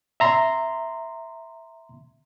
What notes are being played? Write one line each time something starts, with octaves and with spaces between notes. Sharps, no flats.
E5 A#5 C6